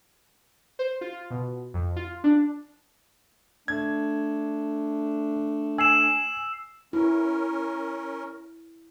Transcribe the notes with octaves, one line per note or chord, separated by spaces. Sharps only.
C5
F4
B2
F2
F4
D4
A3 D4 G#6
G#5 E6 C7 E7
C#4 E4 A#4